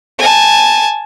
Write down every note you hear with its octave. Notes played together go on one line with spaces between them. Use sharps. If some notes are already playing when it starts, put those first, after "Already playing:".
G#5 A5